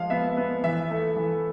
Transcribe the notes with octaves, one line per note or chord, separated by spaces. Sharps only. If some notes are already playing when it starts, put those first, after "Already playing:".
Already playing: F3 G#3 F5
B3 E5
B3
E3 E5
A3
E3